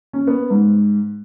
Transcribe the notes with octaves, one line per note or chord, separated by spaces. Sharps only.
C#4
B3
G#2